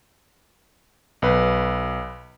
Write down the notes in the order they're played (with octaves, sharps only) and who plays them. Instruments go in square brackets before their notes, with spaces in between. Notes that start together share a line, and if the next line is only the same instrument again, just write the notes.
[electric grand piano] B1 B4